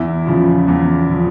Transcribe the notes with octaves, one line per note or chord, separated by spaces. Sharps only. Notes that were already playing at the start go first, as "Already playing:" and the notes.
Already playing: E2 E4
C#3 F3
E2
C#3 F3